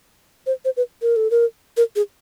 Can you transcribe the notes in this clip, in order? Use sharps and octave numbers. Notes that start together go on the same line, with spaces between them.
C5
C5
B4
A#4
A4
A#4
A#4
G#4